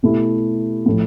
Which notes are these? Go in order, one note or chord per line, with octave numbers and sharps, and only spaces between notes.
B2 A3 E4 G4
A2 F3 A3 E4